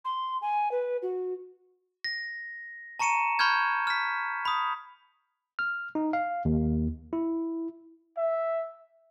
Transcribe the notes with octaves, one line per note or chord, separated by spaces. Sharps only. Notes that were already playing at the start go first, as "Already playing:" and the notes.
C6
G#5
B4
F#4
A#6
A5 A#5 C#6 C#7 D#7 E7
B5 C#6 F6 G6 G#6
F6 B6
B5 D#6
F6
D#4
F5
D#2
E4
E5